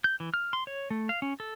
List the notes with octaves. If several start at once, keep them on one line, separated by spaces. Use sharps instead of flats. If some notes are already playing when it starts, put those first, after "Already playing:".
G6
E3
F6
C6
C#5
A3
F5
C#4
A4